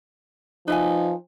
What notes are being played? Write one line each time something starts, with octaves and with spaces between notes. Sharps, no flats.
F3 D#4 B4 E5 G#5